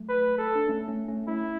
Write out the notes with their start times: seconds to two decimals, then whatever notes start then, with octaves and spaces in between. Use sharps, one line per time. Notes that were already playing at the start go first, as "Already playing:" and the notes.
Already playing: F#3 A3
0.09 B4
0.38 A4
0.55 D4
0.68 A3 C#4
0.88 A3 C#4
1.08 A3 C#4
1.28 A3 C#4 E4